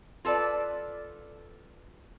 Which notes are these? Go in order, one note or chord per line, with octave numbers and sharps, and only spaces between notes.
F4 A4 B4 D5